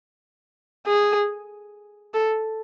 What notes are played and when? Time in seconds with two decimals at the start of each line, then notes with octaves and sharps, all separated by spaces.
0.87 G#4
2.14 A4